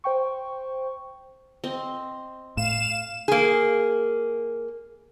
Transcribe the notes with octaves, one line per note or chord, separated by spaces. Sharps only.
C5 G5 C#6
C4 D#5
A2 F5 E7
A#3 G#4